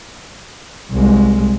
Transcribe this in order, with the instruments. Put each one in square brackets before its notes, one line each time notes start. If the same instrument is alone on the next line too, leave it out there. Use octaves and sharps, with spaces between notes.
[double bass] C2 G#3